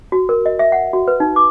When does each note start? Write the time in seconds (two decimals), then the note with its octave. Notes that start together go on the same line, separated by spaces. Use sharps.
0.12 F#4
0.29 A#4
0.46 D#5
0.59 E5
0.72 F#5
0.93 F#4
1.08 B4
1.20 D#4
1.36 D6